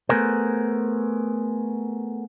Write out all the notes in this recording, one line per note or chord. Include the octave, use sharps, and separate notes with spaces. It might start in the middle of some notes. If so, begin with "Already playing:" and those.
A3 B3 G#4 A#4 C5